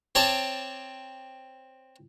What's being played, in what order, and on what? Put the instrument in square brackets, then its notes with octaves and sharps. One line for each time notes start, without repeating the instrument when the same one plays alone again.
[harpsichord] C4 C#5 D5 A5